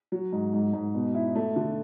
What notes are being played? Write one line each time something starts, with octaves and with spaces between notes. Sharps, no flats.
F#3
G#2
G#2
G#2
B2
E4
A3
D3